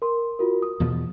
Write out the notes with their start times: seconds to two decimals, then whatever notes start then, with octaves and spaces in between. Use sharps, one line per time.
0.02 A#4 C6
0.39 F4 F#4 A#4
0.62 D#6
0.80 E2 B2 F3